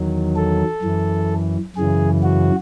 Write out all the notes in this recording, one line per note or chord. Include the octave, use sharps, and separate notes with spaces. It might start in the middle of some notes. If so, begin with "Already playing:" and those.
Already playing: E2 D#3 F#3
A4
F#2 E3
F#2 C#3 E3 G#4
F#4